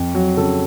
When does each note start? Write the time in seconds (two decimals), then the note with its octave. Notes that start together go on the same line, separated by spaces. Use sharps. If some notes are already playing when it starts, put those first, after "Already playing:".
Already playing: F2
0.15 F#3
0.37 C#3 A4